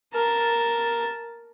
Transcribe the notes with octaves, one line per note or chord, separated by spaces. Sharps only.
A#4 A5